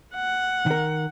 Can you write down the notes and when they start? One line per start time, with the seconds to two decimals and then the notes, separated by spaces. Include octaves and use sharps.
0.15 F#5
0.66 D#3 A#4